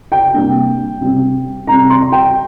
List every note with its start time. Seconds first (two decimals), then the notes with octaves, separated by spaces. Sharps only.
0.12 G5
0.33 C3 G3 A#3 D4
1.01 C3 G3 C4
1.67 C3 G3 C4 A#5
1.90 C6
2.01 A#5
2.12 G5